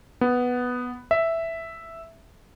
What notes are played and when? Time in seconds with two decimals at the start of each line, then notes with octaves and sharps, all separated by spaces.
0.21 B3
1.11 E5